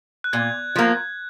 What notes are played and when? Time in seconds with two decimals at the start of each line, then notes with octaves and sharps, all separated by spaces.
0.24 F#6
0.33 A#2 G#6
0.76 F3 A#3